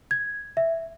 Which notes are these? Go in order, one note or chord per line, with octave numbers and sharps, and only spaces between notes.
G#6
E5